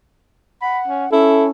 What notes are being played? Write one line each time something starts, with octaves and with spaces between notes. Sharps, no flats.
F#5 B5
C#4
C#4 E4 A4